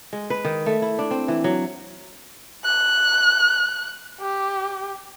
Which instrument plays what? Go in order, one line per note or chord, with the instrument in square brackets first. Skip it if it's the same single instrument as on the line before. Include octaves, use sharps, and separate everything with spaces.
[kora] G#3
B4
D#3
A3
E4
D4
C4
E3
F#3
[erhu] F#6
G4